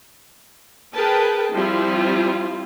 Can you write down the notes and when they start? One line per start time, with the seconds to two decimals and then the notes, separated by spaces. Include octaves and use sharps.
0.94 G#4 A#4 B4 G5 A5
1.53 F3 G3 C4 E4 F4